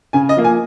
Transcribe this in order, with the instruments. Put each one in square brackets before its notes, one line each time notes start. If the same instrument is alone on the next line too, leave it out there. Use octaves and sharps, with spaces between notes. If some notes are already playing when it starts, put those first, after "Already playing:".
[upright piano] C#3 G#5
D#5
F3 A#3
G#5